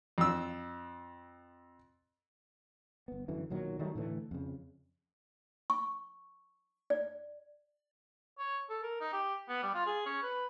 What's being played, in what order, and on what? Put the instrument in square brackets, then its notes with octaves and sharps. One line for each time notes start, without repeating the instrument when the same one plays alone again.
[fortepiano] F2 E6
[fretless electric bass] G1 B3
F#2 D3 E3
B1 A#2 D#3 F#3
D#3 F#3 G3 A3
A2 D3 E3 A3
F2 C#3
[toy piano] C#6
D5
[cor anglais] C#5
A4
A#4
D#4
G4
B3
G3
F4
G#4
C#4
B4